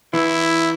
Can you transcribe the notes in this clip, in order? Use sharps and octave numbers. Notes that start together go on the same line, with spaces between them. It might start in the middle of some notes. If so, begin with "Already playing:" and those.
E3 E4